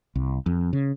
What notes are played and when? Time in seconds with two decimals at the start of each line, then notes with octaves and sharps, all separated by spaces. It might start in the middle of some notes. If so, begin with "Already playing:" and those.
0.15 C2
0.46 F2
0.73 C#3